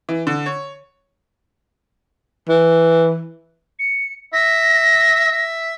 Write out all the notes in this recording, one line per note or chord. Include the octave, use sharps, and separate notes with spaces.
E3
D3
C#5
E3
C#7
E5 A#6
E5